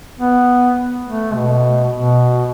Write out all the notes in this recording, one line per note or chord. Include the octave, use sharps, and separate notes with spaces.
B3
A3
B2
B2